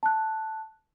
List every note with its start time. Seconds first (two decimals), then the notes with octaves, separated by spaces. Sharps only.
0.03 A5 F#6